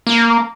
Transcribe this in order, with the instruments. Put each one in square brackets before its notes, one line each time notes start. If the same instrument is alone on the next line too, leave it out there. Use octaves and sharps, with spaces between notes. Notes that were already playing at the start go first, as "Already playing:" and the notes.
[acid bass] A#3